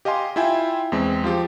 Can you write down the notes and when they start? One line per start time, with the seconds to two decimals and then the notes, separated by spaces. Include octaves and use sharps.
0.05 G4 D#5 F5 G#5 C6
0.36 E4 F4 E5 G5 G#5
0.92 E2 G#3 C4
1.24 F3 F4 G4